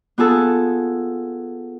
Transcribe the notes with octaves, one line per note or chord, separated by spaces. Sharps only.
B3 F4 G#4 A4